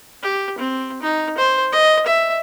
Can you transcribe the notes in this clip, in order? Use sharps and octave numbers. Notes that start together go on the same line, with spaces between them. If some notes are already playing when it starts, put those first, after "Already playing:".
G4
C4
D#4
C5
D#5
E5